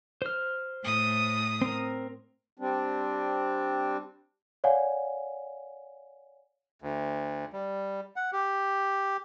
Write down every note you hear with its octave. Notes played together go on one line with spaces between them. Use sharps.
C5 F6
A2 D#6
C4 A#4
G3 C4 D4
C#5 D5 F5 F#5 G#5
D2
G3
F#5
G4